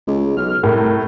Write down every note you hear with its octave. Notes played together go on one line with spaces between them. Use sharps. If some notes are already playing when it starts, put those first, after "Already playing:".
C#2 G#3
B1 F6
C2 A2 A#4